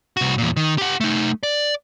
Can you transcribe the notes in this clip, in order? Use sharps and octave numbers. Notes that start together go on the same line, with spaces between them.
C2 F#4
E2 A#2
D#3
G4 F#5
A3 D#4
D5